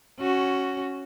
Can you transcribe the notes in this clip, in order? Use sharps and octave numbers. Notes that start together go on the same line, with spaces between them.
C#4 F#4